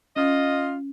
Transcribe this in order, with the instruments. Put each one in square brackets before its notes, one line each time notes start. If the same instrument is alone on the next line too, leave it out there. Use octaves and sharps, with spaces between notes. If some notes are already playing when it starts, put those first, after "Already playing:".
[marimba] C#4 [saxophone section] F4 D#5